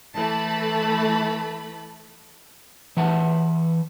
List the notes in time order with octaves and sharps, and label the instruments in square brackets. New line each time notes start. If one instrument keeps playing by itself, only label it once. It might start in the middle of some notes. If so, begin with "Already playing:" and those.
[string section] E3 A3 A5 B5
[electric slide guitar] E3 E5 F#5 A5